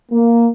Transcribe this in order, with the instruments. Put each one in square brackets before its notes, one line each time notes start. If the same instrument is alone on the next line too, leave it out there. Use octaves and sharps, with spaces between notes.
[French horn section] A#3